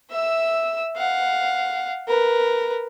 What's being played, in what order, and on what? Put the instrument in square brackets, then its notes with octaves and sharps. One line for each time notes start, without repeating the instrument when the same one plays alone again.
[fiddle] E5 E6
F5 F#5
A#4 B4